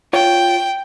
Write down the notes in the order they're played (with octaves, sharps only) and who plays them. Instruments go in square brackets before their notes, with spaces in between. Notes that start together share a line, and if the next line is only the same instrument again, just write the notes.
[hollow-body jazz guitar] F4 C#5 [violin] G5